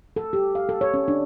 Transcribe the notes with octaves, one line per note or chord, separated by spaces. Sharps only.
A4
G4
F5
A4
C#5
C#4
D4